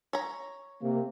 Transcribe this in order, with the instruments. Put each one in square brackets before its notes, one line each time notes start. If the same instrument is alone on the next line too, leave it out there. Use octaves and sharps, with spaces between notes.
[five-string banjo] C#5 A#5
[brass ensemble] C3 A#3